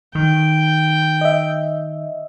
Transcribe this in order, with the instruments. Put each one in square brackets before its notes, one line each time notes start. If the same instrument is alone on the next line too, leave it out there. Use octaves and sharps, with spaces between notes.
[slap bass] D#3 [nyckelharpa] G5
[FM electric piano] D#5 E5